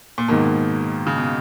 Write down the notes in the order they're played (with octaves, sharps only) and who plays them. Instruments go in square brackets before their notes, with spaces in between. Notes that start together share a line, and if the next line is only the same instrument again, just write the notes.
[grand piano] A#2
[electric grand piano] G#2 D#3 A#3 [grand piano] B2
[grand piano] C#3
B2